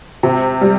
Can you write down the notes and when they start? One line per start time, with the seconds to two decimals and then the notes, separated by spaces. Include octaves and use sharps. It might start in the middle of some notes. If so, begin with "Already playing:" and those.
0.23 C3
0.61 G3